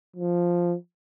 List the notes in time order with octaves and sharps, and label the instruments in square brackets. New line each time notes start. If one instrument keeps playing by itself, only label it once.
[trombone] F3